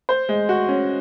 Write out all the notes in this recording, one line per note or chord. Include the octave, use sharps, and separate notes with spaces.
C5
G#3
F#4
C#4